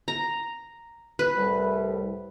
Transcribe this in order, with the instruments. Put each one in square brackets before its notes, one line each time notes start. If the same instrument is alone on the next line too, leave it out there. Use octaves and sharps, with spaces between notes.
[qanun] A#5
B4
[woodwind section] C2 A2 G3